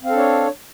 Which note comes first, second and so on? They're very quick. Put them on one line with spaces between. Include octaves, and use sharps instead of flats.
C4 F5 A4 D4 C#5